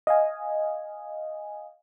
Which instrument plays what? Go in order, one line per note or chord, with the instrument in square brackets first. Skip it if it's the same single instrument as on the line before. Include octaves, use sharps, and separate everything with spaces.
[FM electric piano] D#5 F5 G#5